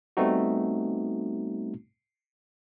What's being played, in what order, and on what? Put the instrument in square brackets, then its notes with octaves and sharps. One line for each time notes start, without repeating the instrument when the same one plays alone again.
[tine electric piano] G3 A3 B3 C4 D#4 F#4